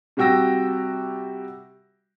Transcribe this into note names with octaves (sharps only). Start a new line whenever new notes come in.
C3 G3 F#4 G5 E6 A#6